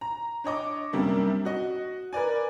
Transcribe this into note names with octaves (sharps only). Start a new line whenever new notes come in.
A#5
D4 C#5 D#5 D6
F#2 C3 G3 A#3 D4
F#4 D#5
A#4 B4 D5 G#5